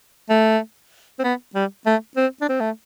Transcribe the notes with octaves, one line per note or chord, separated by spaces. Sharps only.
A3
C4
B3
G3
A3
C4
D4
C4
A3